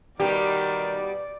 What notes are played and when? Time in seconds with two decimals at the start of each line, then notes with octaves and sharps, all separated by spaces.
0.20 B2 D#3 G3 G4 D5